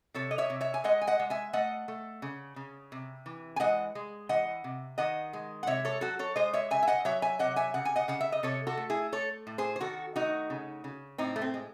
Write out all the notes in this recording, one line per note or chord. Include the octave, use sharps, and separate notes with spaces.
C3 A4 C#5
D#5
C#5 E5
C3
C#5 E5
G#5
G#3 D#5 F#5
G#5
D#5 F#5
G#3
E5 G#5
A3 D#5 F#5
A3
C#3
C#3
C3
E3
G#5
G#3 D#5 F#5
G#3
E3 D#5 F#5
C3
D#3 D#5 F#5
G#3
F#5
C3 C#5 E5
A4 C#5
F#3 F#4 A4
A4 C#5
G#3 C5 D#5
C#5 E5
C#3 E5 G#5
E5
D#5 F#5
F#3 C#5 E5
E5 G#5
C3 D#5 F#5
E5 G#5
C#3 F#5
G#5
D#5 F#5
C#3 F#5
E5
D#5
C3 A4 C#5
F#4 A4
A3
E4 G#4
A3 A4 C#5
A2
G#4 C5
C5
D#3 F#4 A4
A3 D#4 F#4
C#3
C#3
A2 C4 D#4
A3
C4
G#3